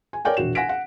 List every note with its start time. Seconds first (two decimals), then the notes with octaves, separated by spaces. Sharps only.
0.13 G#5
0.25 A#4 C#5 D5 G5 G#5
0.37 E1 A#1 F#4 E7
0.55 F#5 G#5 A#6 B6 D7
0.69 F#5